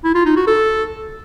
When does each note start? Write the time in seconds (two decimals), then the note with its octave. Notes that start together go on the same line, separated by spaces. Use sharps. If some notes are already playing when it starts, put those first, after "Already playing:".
0.04 E4
0.15 F4
0.26 D#4
0.36 F#4
0.47 A4